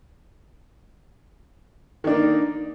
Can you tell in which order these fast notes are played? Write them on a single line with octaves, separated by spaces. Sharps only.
D#3 D4 A#3 D#4